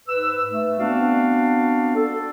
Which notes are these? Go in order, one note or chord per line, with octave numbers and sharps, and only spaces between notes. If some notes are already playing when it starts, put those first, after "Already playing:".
G#2 B4 E6
A3
B3 C4 D4 F#4 D5 F5
A4